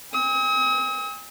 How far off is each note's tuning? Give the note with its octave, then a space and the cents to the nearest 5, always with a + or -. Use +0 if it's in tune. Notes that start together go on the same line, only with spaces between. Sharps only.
G#5 -45 D#6 +45